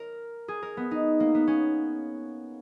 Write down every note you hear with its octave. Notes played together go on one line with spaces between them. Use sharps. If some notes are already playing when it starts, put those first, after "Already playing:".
Already playing: A#4
G#4
A#4
B3
D#4
A#3
B3
C#4